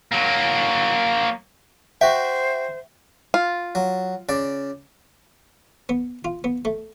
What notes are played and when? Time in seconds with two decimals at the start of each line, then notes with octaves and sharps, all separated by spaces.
0.12 F#3 A#3
2.01 F#4 C5 E5 G5
3.34 F4
3.75 F#3
4.29 C#3 D5
5.89 B3
6.25 F4
6.44 B3
6.65 A3